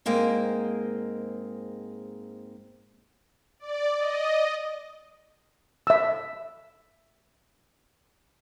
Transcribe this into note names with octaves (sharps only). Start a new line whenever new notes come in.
G#2 G#3 A#3 C4
D5
D#5
E5 E6